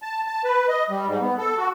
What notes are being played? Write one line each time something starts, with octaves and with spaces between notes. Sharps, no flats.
A5
A5
B4
D#5
G3
G#2
B3
A4
F#4